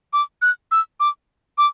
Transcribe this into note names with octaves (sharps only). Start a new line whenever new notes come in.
D6
F#6
E6
D6
D6